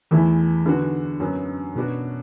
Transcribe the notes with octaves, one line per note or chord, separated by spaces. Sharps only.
E2 E3 A3 E4
D3 B3 D4 F#4
F#2 F#3 B3
B2 B3 D4 F#4